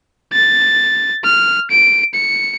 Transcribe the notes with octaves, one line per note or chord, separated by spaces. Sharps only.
A6
F6
D7
C#7